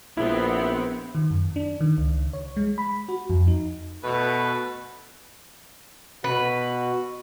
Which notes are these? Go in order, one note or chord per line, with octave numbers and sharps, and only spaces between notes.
A#1 B3 C4 E4
D#3
F#2
D4
D#3
C#2
C#5
G#3
B5
F#4
F2
D#4
B2 A3 B4
B2 F#4 B4